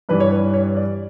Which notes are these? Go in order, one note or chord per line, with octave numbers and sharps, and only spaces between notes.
G2 E3 G3 B4
C#5
B4
C#5
D5